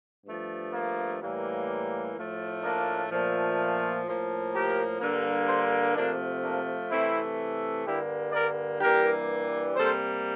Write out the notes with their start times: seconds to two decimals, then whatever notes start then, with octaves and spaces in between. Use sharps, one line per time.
0.26 G2 F3 A3
0.73 A#3
1.21 A2 E3 G3 A#3
2.15 A2 F3 A3
2.62 A#3 D4
3.11 A#2 F3 A3
4.05 A2 F3 A#3
4.53 G4 A#4
5.00 G2 D3 G3 A#3
5.48 A4 C5
5.95 C3 F3 A3 A#3 D4
6.43 A#3 D4
6.90 C3 E3 A3 C4 E4
7.85 G2 D3 G3 A#3 E4 G4
8.32 A#4 D5
8.80 G2 E3 G3 A#3 G4 A#4
9.75 C3 G3 A#3 A4 C5